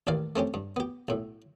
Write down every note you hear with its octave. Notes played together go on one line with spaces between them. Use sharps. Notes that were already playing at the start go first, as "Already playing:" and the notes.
A1 D#2 E3 D5 F5
A3 C4 C#4 G4
G2
B3 G4
B1 A2